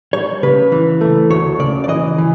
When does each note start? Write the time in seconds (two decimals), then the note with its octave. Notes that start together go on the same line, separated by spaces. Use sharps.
0.13 G3 C#5
0.43 C#3 B4
0.72 E3
1.01 A3
1.30 D2 C#5
1.59 C#3 D5
1.84 D5
1.88 E3 D#5
2.18 E3